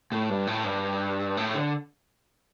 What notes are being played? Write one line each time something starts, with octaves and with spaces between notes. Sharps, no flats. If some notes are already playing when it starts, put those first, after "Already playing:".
A2
G2
A2
G2
A2
D3